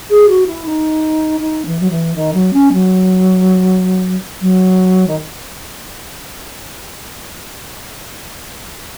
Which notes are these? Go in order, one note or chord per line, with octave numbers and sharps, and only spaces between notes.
G#4
F#4
E4
D#4
D#4
E3
F#3
E3
D#3
F#3
C#4
F#3
F#3
D#3